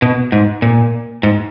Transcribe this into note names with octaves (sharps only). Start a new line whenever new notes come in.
B2
G#2
A#2
G#2